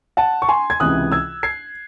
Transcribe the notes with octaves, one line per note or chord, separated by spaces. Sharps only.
F#5 A5
C#6
G#5 C6
G#6
C#2 C3 E3 D#6 F#6
E6 G#6
G#6 C7